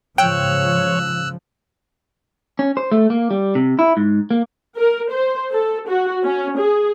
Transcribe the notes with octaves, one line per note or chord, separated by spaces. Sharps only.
G#2 C#3 F3 C#5 G5 E6 F#6
C#4
C5
A3
A#3
G3
C3
E4
G#2
A#3
A#4
C5
A4
F#4
C#4
G#4